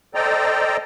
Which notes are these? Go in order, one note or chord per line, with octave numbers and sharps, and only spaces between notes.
A4 C5 D5 D#5 G5 A#5